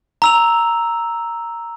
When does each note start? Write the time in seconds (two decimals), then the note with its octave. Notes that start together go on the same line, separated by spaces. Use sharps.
0.22 A#5 E6 F7